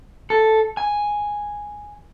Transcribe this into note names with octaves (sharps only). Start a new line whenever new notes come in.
A4
G#5